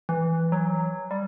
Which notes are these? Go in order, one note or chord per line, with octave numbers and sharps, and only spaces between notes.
E3
F#3
G3